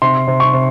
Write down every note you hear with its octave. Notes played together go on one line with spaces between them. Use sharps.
C3 C6
C3
C#6
C3